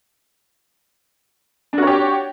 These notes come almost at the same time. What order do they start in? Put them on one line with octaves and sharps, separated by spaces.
D4 F#4 C#5 G4